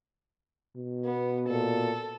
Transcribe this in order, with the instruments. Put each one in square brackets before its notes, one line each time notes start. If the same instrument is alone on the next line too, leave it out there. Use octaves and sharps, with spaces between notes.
[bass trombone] B2
[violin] B3
[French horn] A#2 [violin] A4